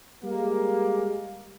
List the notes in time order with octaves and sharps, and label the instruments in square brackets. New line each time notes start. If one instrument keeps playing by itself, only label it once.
[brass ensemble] G3 G#3 A#3